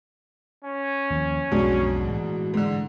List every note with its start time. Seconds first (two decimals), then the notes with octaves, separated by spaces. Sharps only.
0.64 C#4
1.10 D#2 F3
1.52 B1 F2 G#2 B2 D4
2.08 A2 E3 G#3
2.54 G#2 D3